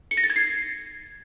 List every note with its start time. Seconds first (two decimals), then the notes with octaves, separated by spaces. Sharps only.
0.11 C#7
0.17 A#6
0.24 A6
0.30 G#6
0.36 C7